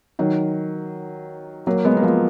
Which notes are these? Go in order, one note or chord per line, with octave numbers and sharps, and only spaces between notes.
D#3 F#3
F#3 A#3
G#3 B3
A#3
F3 G#3